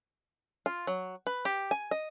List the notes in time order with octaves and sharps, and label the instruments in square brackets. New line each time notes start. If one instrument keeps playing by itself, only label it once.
[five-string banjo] F4
F#3
B4
G4
G#5
D#5